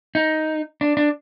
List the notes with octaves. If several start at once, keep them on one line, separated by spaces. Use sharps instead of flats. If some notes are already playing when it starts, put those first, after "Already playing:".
D#4
D4
D4